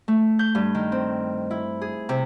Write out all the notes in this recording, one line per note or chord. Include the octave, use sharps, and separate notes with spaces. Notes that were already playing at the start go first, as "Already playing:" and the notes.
A3
G6
G2
D#3
C4
E4
G#4
C3